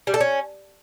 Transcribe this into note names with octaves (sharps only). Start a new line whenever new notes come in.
G3
A4
C#4